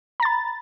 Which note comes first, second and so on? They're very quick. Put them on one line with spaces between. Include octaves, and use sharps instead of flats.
A#5 A6 B5